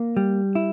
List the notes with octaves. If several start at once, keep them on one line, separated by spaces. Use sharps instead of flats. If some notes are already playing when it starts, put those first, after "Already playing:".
Already playing: A#3
G3
E4